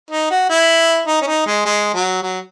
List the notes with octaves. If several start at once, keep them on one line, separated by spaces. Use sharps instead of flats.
D#4
F#4
E4
D#4
C#4
D#4
G#3
G#3
F#3
F#3